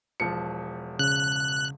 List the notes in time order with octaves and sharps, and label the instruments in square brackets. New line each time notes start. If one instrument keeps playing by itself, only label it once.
[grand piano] E1 F3 C#7
[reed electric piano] C#3 [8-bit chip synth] F#6